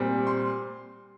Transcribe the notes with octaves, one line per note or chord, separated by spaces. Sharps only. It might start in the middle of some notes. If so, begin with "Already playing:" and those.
Already playing: A#2 G3 C4
C6